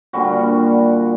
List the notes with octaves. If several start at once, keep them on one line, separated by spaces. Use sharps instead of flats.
A#2 D3 G3 F#4